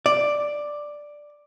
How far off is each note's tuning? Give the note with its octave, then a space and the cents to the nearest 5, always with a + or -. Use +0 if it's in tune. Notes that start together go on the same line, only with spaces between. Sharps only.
D5 +5